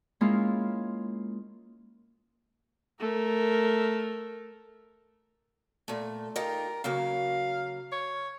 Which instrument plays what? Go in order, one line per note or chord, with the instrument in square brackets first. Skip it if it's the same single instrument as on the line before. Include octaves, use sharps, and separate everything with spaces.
[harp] G#3 A#3 C#4 E4 F4
[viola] A3 A#4
[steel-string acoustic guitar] A#2 A3
[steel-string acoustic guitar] D#4 F4 G4 [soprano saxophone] A#4
[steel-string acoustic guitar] C#3 F#3 A#3 [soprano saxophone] F5
[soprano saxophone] C#5